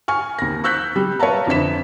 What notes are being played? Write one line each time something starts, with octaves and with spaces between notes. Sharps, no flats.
G#5 C#6 F6
D#2 A#6
C#6 E6 F#6 G6 B6
G3
B4 C#5 E5 F5 A5 A#5
F2 D3 E3 B6 E7